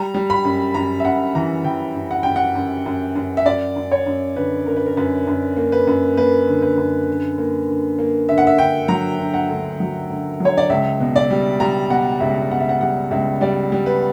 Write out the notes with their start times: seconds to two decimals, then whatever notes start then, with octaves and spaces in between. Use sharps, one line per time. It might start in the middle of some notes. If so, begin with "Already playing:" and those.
Already playing: G3 A#5
0.14 G3
0.30 B5
0.45 F#2
0.74 F#2 A#5
1.00 E5
1.05 F#2 F#5
1.35 E3 A#5
1.64 E3 G5
1.95 F#2
2.11 F#5
2.23 F#2 G5
2.36 F#5
2.55 F#2
2.86 F#2
3.15 F#2
3.37 E5
3.45 F#2 D5
3.76 F#2
3.92 C#5
4.06 F#2
4.36 D3 B4
4.66 F#2 A#4
4.76 B4
4.86 A#4
4.97 F#2 B4
5.27 F#2
5.57 A#3
5.72 B4
5.87 F#2
6.17 A#3 B4
6.48 D3
6.62 B4
6.77 F#2
7.08 D3
7.38 A#3
7.68 D3
7.99 A#3
8.29 D3 E5
8.38 F#5
8.47 E5
8.58 D3 G5
8.88 F#3 A#5
9.19 D3
9.34 F#5
9.49 D2
9.80 F#3
10.09 D2
10.40 F#3
10.45 C#5
10.57 D5
10.70 C#2 E5
11.00 B2
11.16 D5
11.31 G3
11.60 G3 A#5
11.90 B2 F#5
12.20 C#2 E5
12.51 B2 F#5
12.60 E5
12.69 F#5
12.81 G3 F#5
13.11 C#2 E5
13.41 G3 D5
13.72 G3
13.86 B4